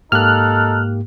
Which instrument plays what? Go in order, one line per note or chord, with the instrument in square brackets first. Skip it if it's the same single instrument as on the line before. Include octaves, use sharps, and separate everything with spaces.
[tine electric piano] G#2 A#3 G4 [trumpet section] D#4 A4 [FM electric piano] F6 F#6